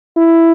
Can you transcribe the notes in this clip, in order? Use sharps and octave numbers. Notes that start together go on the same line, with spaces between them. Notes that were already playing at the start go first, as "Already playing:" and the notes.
E4